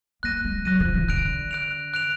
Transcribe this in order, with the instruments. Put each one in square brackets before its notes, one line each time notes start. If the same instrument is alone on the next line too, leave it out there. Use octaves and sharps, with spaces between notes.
[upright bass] A#3 [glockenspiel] F#6 A#6 D#7
[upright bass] G#3
[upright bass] F#3 [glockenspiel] F#6 A#6 D#7
[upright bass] F3
D#3
[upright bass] D3 [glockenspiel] F#6 D7 F7
[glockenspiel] F#6 D7 F7
F#6 D7 F7